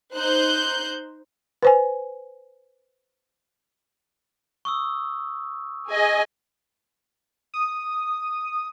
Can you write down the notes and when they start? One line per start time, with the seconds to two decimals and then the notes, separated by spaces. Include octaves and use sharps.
0.15 D#4 C5 F#6 G6
1.63 B4 C5 G#5
4.65 C#6 D#6 E6
5.91 G#4 D#5 G#5
7.54 D#6